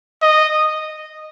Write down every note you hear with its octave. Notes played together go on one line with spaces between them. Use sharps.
D#5